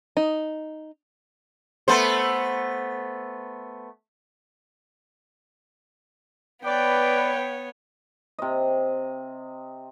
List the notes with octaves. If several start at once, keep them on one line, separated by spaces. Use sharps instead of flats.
D#4
A3 B3 C5
B3 B4 C#5 D5 G5
C3 D#5